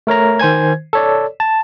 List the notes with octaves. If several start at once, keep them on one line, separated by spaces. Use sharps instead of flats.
A3 A#4 C#5 A#5
D#3 C5 G#5 G#6
A4 C#5 D5
A5